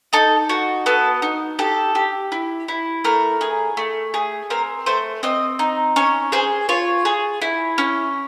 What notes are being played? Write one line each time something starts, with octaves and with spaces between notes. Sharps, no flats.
D#4 A4
F#4
B3 A4
D#4
G4 A4
G4
E4
E4
A3 A#4
G#4
A3
G#4
C4 A#4
A3 C5
C4 D#5
D#4
C#4 C#5
G#4 C5
F4 C#5
G#4
E4
C#4